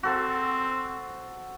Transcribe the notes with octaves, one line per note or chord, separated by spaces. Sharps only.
C4 F#4 A4 C5